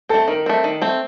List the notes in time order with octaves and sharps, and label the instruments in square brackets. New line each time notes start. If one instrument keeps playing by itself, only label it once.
[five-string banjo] C4 [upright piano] A4
[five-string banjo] A3
[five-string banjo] D#3 [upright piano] A#4
[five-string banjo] A3 C4
D#3
A3 C4